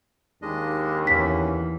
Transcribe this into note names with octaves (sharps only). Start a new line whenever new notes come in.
D#2 G#3 D4 D#5
E2 E3 C#4 B6